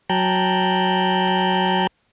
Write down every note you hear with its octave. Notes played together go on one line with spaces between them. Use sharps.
F#3 G5 A5 A#5 F#6 G6